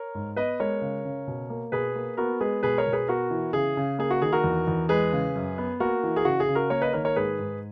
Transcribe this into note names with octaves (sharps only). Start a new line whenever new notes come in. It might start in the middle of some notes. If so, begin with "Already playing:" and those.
Already playing: A#4 C#5
G#2
B3 B4 D#5
G#3 A#4 C#5
C#3
C#3
B2
A#3
B2 G#4 B4
A#3
B3 F#4 A#4
G#3 G#4 B4
B2 G#4 B4
A#4 C#5
B2
G#4 B4
B3 F#4 A#4
E3
C#3 G#4
C#3
A#3 G#4
F#4
D#3 G#4
F#4 A#4
E2
E2
G#3 G#4 B4
C#3
F#2
B3
A#3 F#4 A#4
E3
G#4
C#3 F#4
G#4
C#3
F#4 A#4
A#3 A#4 C#5
B4 D#5
D#3 A#4 C#5
A#4 C#5
G#2 G#4 B4
G#2